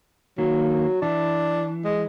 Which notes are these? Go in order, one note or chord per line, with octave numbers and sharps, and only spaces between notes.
D#3 F#3 A#3
E3 D4
G#3